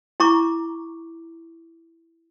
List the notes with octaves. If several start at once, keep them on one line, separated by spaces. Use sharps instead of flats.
E4 A#5 C#6 D6